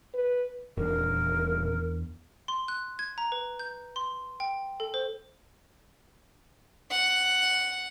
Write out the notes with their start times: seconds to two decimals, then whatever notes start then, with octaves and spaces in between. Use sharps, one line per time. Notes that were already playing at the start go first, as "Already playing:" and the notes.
0.14 B4
0.77 D#1 E2 D4 A#4
2.48 C6
2.68 F#6
2.99 G#6
3.18 A#5
3.32 B4
3.59 G6
3.96 C6
4.40 G5
4.80 A4
4.94 C5
6.91 F#5